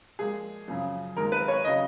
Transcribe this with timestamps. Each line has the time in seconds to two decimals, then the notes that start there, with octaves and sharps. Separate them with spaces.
0.19 A#2 F3 G#3 G#4
0.68 F#2 C#3 F3
1.17 D#2 D#3 G#3 A#4
1.32 B4
1.48 C#5
1.65 C#3 F#3 D#5